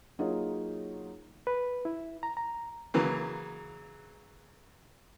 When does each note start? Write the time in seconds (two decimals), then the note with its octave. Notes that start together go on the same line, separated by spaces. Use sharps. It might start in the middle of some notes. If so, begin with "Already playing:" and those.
0.19 F#3 A#3 D#4 F4 G#4 C#5
1.47 B4
1.85 E4
2.23 A#5
2.37 A#5
2.94 C#3 E3 F#3 A#3